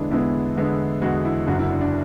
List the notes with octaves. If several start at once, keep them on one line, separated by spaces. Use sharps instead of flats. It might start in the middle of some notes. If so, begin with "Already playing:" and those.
Already playing: E2 D3 G#3 B3 D4 E4
E2 D3 G#3 B3 E4
E2 D3 G#3 B3
E2 D3 G#3 B3 F#4
E4
F#1 F#2 D3 F#4
E4
D4
D4